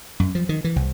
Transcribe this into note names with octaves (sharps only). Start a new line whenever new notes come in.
F#2
F3
D#3
E3
C2